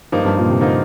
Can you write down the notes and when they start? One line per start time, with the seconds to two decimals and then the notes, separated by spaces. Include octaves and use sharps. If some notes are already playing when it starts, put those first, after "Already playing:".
0.12 G2 F3 A#3 D#4
0.25 G2
0.38 A#2
0.49 C3
0.61 D3 F3 A#3 D#4